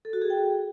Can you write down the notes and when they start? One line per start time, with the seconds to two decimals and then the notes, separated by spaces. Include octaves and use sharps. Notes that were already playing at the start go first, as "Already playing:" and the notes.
0.05 A4
0.13 F#4
0.22 G#4
0.30 G5